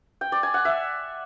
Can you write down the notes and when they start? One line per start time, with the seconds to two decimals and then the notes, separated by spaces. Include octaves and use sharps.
0.21 G5
0.32 D5
0.43 G#5
0.54 F#5
0.65 E5